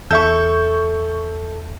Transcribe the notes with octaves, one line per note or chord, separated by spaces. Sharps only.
E2 A4 E5 C#6 G6